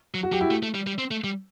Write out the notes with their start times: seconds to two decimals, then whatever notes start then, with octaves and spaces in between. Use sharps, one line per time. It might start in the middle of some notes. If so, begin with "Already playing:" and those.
0.14 F#3
0.23 F#4
0.32 F#3 G4
0.41 E4
0.51 A3
0.63 A3
0.75 G3
0.87 G3
0.98 C4
1.11 A3
1.24 G3